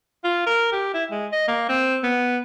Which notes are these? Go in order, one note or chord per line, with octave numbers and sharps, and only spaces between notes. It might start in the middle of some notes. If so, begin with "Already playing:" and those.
F4
A#4
G4
E4
G#3
D#5
A#3
C4
B3